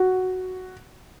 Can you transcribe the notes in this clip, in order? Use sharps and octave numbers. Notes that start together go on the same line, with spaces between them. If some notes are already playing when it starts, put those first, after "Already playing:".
Already playing: F#4